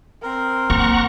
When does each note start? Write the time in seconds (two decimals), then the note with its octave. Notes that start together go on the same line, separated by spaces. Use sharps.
0.23 C4 A#4
0.70 A#3 F#5 A#5 C#6